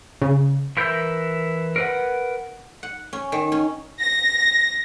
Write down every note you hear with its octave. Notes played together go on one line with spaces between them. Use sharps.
C#3
E3 E4 A#4 G6
A#4 B4 F#5
F#5
C#4
D#3
C#4
A#6